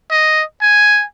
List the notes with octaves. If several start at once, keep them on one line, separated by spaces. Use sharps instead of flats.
D#5
G#5